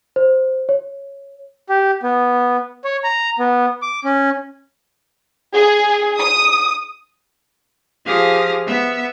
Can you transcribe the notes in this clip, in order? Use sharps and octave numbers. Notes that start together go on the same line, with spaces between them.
C5
C#5
G4
B3
C#5
A#5
B3
D6
C#4
G#4
D#6
F3 G4 G#4 F5 D#6 A#6
B3 E5 E6